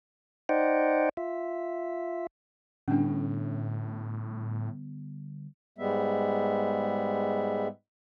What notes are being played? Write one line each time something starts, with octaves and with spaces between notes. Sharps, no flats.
D#4 C5 D5 D#5 F#5 G5
F4 E5
A2 D3 G3 B3 C#4 D4
G#2 G3 G#3 B3 E5